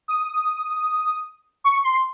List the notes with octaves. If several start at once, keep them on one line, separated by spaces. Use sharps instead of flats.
D#6
C#6
C6